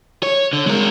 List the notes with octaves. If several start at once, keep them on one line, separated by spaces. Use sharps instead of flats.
C#5
D3
G#3 A#4